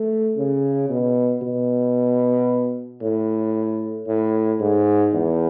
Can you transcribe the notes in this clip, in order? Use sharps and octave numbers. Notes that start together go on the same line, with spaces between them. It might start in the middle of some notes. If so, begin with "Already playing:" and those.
Already playing: A3
C#3
B2
B2
A2
A2
G#2
E2